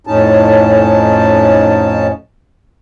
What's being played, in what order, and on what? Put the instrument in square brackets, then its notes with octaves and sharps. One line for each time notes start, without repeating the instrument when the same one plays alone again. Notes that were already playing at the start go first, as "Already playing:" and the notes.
[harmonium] F2 A2 C#4 D#4 A5